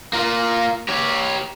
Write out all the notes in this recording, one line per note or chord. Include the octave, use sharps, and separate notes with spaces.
A#3 F4
G4 C#5